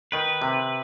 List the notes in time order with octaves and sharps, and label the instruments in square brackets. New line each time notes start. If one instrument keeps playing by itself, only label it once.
[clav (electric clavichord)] D#3 [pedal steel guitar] B4
[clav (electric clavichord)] C3